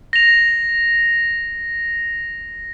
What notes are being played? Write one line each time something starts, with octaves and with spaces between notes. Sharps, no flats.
A#6 F7